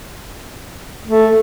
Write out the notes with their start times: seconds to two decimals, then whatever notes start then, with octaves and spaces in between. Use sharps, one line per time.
1.07 A3